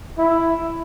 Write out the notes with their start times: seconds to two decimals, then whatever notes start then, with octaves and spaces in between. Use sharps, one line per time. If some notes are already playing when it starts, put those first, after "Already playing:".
0.18 E4